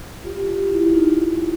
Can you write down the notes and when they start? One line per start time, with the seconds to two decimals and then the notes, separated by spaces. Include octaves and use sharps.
0.24 F4 G4
0.47 F4 G4
0.71 E4 F#4
0.93 D#4 F4